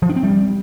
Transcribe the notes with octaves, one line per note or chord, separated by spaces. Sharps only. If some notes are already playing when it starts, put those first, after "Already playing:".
F3
D4
C4
G3